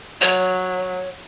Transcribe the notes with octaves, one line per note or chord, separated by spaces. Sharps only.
F#3 C#5